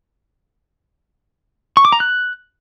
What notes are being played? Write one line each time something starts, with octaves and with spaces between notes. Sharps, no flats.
C#6
D6
A#5
F#6